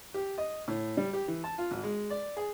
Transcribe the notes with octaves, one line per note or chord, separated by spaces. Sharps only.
G4
D#5
A2
G3
G4
E3
A5
F4
G#1
G#3
D5
G#4